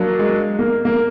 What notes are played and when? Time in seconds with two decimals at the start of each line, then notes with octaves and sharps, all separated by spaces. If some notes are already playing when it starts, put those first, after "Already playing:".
Already playing: F#3 A#3 D4
0.19 G#3
0.59 A#3
0.85 A#3